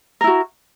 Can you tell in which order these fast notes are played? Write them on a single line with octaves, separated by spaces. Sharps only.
A#4 E4 F#4